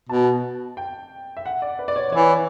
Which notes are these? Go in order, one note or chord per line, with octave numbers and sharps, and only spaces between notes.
B2 A5
G5
E5
F#5
D5
B4
D5
C#5
E3 C#5